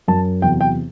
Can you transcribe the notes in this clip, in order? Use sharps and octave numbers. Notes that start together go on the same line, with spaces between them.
F#2 F#3 A5
E2 C3 F#3 G5
G5